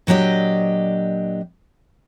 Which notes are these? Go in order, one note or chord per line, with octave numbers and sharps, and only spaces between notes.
A#2 F#3 D4 G4 D#5